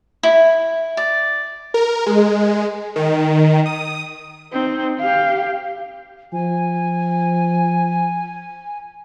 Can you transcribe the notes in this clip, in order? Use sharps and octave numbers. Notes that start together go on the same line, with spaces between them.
E4
D5
A#4
G#3
D#3
D#6
C4 D#4
G4 F5
F3 G#5